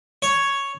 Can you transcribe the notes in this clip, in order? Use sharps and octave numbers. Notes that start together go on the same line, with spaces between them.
C#5